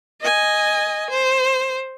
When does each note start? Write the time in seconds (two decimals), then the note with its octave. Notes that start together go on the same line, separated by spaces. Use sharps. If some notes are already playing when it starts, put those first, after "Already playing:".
0.21 D#5 G#5
1.10 C5